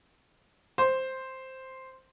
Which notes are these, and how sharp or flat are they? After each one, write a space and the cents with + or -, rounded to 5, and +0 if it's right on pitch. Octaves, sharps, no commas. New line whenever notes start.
C5 +0